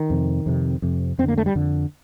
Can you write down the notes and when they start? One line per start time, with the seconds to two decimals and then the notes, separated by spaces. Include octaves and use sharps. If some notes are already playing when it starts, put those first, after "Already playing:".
Already playing: D#3
0.10 F2 C3
0.46 F2 C3
0.82 F2 C3
1.18 F2 C4
1.24 D3 A#3
1.38 A3
1.46 G3
1.55 F2 D3